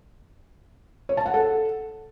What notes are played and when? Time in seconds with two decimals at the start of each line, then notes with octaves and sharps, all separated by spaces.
1.09 C#5
1.17 A5
1.26 F#5
1.34 A4